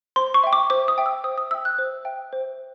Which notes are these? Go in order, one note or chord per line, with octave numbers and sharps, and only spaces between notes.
C5 C6
C#6
E5 G5
D6
C5 D6
D#6
E5 G5
E6
C5 D#6
D#6
E5 G5 E6
F#6
C5
E5 G5
C5